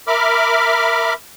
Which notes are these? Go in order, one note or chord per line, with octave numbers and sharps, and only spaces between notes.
A#4 E5 B5 D6 F6